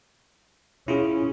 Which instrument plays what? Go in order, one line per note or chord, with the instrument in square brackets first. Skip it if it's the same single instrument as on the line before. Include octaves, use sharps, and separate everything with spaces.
[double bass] C#4 [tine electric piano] E4 F4 G#4